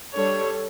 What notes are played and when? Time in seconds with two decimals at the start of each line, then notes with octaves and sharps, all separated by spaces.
0.14 G3 D4 A4 C#5